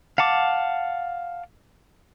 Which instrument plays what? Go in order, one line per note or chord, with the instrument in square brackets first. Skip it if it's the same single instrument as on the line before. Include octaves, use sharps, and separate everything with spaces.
[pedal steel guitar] F5 F#5 A5 D6